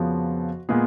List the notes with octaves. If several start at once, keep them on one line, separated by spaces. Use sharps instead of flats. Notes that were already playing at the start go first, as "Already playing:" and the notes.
Already playing: F2 C#3 F3 B3 F#4
A#2 G#3 B3 G#4